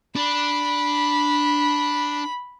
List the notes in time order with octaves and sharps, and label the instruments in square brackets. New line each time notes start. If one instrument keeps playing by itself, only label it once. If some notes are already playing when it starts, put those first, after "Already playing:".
[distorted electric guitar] D4 [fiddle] B5